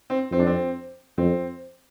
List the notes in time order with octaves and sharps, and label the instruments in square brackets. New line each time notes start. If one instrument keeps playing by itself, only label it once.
[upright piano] C4
[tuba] F2 [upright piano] C4
[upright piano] D4
C4
[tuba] F2 [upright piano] C4